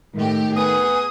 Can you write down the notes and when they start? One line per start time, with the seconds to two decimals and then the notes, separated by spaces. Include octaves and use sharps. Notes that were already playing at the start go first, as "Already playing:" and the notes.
0.15 A2 D#3 A3 G4
0.56 B3 G#4 D#6